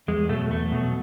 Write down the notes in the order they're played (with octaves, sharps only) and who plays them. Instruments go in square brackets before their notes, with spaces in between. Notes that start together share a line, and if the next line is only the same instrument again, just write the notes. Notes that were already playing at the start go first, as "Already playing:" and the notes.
[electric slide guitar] E2 G#3
B2 F#3 A3
E2 A3
B2 F#3